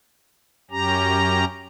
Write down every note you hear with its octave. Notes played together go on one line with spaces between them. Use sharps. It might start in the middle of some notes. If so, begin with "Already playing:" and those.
F#2 C#4 G4 A#5